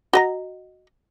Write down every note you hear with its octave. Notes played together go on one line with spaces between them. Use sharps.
F#4 D#5 A#5